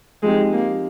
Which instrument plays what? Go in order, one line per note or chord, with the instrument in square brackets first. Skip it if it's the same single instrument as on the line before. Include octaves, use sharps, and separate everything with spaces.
[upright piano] F3 C4 D#4 G4 [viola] G#3
[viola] A#3